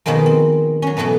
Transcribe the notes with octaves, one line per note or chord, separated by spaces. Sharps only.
B2 D#3 F3 G#3 A#3
C4
F#3 C#4
B2 E3 F#3 A3 B3